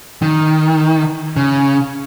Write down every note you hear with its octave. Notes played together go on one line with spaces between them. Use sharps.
D#3
C#3